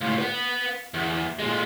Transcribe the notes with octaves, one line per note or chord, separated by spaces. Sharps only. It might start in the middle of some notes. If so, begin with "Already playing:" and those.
C#2 A2
B4 F#5
E2
A#2 G#3